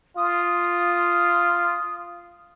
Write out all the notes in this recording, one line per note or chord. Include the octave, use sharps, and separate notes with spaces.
F4 D#6